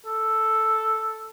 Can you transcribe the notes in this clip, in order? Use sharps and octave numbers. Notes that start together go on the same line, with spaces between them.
A4